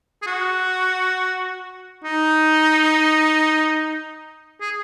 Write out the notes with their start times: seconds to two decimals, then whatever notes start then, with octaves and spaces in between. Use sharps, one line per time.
0.22 G#4
0.27 F#4
2.04 D#4
4.61 G#4